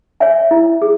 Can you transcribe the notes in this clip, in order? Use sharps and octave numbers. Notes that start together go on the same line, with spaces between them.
C#5 E5 G#5
E4
G#4